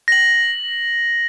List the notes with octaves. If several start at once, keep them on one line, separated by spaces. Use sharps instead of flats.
A#6 F#7